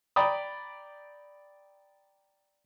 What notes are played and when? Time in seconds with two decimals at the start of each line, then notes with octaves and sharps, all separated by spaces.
0.16 D5 G5 A#5 B5 D#6